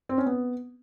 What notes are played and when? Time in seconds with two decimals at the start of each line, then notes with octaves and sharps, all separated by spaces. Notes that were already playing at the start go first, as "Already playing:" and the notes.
0.09 C4
0.18 C#4
0.26 B3